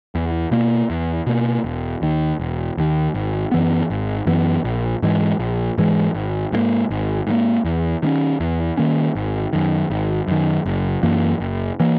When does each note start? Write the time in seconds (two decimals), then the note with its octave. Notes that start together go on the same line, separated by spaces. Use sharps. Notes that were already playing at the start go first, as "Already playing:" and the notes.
0.15 E2
0.51 B2 A#3
0.90 E2
1.26 B2 A#3
1.64 E1
2.02 D#2 D#3
2.39 E1
2.77 D#2 D#3
3.14 G#1
3.52 F#2 E3 B3
3.90 G#1
4.26 F#2 E3 B3
4.64 A#1
5.02 G#2 E3 G#3
5.39 A#1
5.78 G#2 E3 G#3
6.14 G#1
6.52 G#2 D#3 A#3
6.90 G#1
7.27 G#2 D#3
7.31 A#3
7.64 E2
8.03 D#3 A#3 C#4
8.40 E2
8.77 D#3 A#3 C#4
9.15 G#1
9.53 F#2 D#3
9.90 G#1
10.28 F#2 D#3
10.66 F#1
11.03 F#2 E3 A#3
11.40 F#1
11.80 E3 A#3